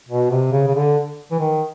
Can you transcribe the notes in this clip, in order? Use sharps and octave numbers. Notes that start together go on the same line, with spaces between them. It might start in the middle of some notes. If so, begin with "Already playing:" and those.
B2
C3
C#3
C#3
D3
E3
D#3